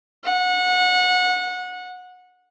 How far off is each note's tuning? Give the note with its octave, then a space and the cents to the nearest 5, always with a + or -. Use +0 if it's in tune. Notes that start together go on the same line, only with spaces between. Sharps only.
F#5 -25